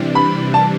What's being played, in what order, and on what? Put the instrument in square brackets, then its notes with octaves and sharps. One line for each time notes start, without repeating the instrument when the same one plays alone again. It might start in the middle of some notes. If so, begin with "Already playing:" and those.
Already playing: [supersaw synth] C3 E3 G3 D4
[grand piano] B5
A5